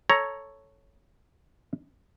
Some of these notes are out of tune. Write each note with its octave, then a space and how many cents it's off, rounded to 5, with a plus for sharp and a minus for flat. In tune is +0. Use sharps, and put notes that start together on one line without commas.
A4 +0 C#5 +0 A#5 +10